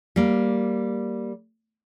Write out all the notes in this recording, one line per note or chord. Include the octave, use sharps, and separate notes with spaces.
G3 A#3